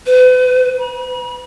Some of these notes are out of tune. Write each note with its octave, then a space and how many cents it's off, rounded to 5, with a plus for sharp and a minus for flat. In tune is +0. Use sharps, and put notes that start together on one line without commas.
B4 +40
B5 -45